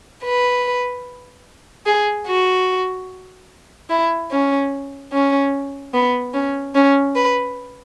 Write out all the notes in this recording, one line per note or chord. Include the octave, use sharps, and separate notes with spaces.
B4
G#4
F#4
E4
C#4
C#4
B3
C#4
C#4
B4